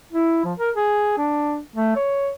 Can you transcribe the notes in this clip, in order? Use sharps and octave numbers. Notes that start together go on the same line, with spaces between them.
E4
F3
A#4
G#4
D4
A3
C#5